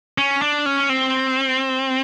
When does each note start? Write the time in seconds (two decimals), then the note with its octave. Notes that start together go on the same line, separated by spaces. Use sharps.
0.18 C#4
0.42 D4
0.66 C#4
0.89 C4